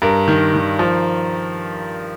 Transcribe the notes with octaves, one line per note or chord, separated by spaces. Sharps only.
G2 A#4
D#3
D#3
F3